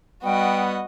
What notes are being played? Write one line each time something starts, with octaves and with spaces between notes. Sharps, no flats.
G3 B3 F#4 D#5 G5